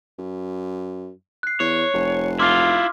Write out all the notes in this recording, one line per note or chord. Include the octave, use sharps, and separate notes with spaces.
F#2
F#6 C7
E2 C#5
F1
E4 F4 C6 D6 F6